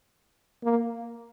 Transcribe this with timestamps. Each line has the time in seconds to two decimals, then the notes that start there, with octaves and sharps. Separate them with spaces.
0.64 A#3